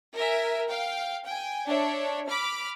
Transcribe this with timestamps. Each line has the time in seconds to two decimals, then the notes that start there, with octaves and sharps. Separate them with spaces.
0.15 A#4 E5 G#5
0.68 F5 G5
1.24 G5 G#5
1.67 D4 C#5 E5
2.28 B5 D6 F6